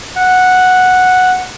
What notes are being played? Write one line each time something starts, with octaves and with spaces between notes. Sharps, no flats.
F#5